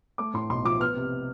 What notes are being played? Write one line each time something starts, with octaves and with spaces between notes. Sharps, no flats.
A3 D6
A2 C6
B1 C6
F3 D6
B3 F6
C3